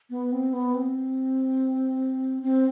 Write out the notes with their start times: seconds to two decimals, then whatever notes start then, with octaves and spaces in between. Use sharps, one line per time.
0.10 B3
0.32 C4
0.53 B3
0.74 C4
2.43 C4